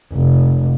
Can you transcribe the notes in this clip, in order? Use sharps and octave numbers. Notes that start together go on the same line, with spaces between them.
F1